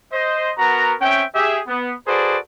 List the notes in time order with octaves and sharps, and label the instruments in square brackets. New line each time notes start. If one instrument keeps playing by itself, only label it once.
[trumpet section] C5 D#5
B3 F#4 A#4 A#5
C4 C#4 E5 G5
G4 G#4 E5
B3
F#4 G#4 A4 B4 C5 D5